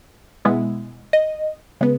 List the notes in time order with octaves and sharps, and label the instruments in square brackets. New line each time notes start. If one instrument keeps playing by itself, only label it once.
[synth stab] B2 G#3 B3 E4
D#5
C#3 G#3 B3